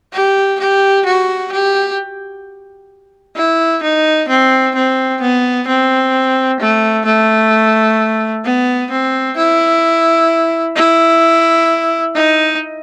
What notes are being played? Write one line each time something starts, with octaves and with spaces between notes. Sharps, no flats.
G4
G4
F#4
G4
E4
D#4
C4
C4
B3
C4
A3
A3
B3
C4
E4
E4
D#4